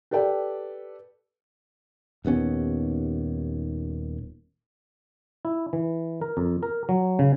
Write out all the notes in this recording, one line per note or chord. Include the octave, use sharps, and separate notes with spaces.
G4 A4 B4 D5 G5
D#1 D#2 B3 C#4
E4
E3
A#4
F2
A#4
F#3
C#3